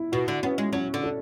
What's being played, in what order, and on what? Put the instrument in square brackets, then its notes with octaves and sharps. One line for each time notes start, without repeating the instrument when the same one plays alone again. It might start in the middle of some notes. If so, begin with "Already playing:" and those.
Already playing: [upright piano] E4
[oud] B2 [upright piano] F#4
[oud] D3
[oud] B3 [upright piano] C#4
[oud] G#3
[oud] F#3 [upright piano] C#4
[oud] D3
[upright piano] A4